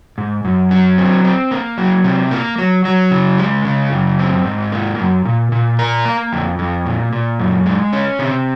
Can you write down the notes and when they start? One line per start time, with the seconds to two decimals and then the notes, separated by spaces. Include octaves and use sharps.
0.18 G#2
0.45 F#2
0.71 F#3
0.98 C4
1.25 C4
1.51 A#3
1.78 F#3
2.04 C3
2.31 A#3
2.58 F#3
2.85 F#3
3.11 C#3
3.38 G#3
3.65 C#3
3.92 F#2
4.19 C4
4.45 G#2
4.72 A#3
4.99 F#2
5.25 A#2
5.52 A#2
5.79 A#4
6.05 A#3
6.33 F2
6.59 F2
6.86 A#2
7.13 A#2
7.40 F#2
7.66 G#3
7.93 C#4
8.19 C3